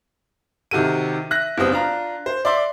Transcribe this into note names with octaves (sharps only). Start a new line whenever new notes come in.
C3 D#3 F#4 A4 D#7
E5 F#6 A#6
F#1 G3 B3 C4 D4 D#6
D4 F4 A#5
C5
D5 E5 C6 D6